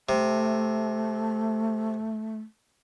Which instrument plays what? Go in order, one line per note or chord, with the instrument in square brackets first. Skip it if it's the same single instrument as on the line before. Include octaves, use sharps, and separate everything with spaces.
[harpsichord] C3 [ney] A3